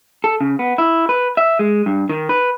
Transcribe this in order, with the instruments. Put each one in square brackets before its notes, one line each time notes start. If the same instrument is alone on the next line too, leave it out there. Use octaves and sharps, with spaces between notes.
[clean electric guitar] A4
C#3
B3
E4
B4
E5
G#3
G2
D#3
B4